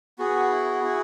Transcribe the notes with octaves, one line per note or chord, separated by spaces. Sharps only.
B3 F#4 G#4
E4
E4